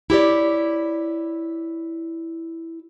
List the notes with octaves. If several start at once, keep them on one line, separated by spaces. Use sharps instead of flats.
E4 G4 C#5 D5